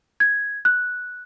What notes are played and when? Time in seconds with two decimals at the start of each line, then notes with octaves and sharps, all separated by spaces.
0.20 G#6
0.65 F#6